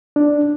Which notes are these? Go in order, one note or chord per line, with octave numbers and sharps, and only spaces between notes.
D4